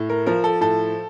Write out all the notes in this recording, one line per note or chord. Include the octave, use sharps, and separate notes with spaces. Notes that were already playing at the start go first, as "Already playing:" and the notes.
Already playing: A2
A#4
F3 A#4
A4
A2 A4